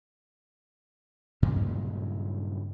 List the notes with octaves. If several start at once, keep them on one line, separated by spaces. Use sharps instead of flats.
G2 A#2 C#3 F#3